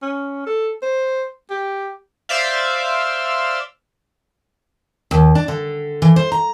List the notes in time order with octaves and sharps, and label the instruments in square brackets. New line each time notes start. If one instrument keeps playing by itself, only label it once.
[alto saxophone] C#4
A4
C5
G4
[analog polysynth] C5 D5 E5 F5
[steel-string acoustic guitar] D#2
D4
D3
E3
C5
A#5